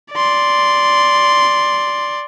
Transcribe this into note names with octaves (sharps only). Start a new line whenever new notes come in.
D5 C6